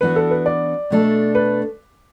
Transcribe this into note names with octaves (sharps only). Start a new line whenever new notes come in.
E3 B3 D4 F#4 B4
A4
B4
D5
B2 A3 D4 A4
B4